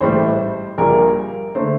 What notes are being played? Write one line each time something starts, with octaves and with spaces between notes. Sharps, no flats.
A1 A2 G3 C5
A#1 A#2 G3 A#3 A#4
D3 A3 C5